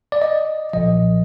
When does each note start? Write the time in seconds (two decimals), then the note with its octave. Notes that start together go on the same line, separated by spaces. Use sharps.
0.12 D5
0.22 D#5
0.73 B1 A#2 F3 D#5